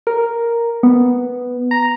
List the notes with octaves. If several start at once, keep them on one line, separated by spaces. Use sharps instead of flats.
A#4
B3
A#5